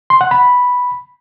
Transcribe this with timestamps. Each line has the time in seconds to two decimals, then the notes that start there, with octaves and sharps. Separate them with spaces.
0.10 C6
0.21 F#5
0.31 B5